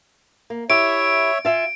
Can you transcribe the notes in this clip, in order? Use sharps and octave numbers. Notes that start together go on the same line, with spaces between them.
A#3
E4 G4 C#5 E5 D7
F4 E5 G#5